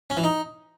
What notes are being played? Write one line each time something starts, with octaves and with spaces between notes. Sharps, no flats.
C#4
E3
D#4